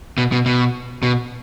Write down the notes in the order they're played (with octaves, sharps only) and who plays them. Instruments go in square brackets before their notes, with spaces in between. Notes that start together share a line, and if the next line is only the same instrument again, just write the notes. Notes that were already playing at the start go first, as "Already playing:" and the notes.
[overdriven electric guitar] B2
B2
B2
B2